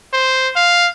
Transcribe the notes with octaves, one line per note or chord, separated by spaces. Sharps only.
C5
F5